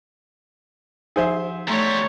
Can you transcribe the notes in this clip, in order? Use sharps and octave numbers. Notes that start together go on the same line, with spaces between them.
F3 D#4 G#4 C5 E5
E2 G3 A3 C#5 A#5 C6